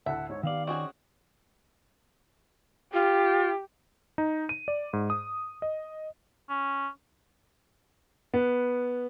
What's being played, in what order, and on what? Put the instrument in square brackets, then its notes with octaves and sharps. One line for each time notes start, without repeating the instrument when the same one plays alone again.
[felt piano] D2 A2 A5 [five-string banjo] E5 [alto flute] F#5
[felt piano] G#2 [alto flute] C#5
[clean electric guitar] D#3 D5 [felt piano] B3 G4 [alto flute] F5
[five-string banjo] C4 F#4 G#4 [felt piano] C#4 D#5 [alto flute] C#6
[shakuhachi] F4 [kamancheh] G4
[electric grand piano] D#4
D#7
D5
G#2
D#6
D#5
[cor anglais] C#4
[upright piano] B3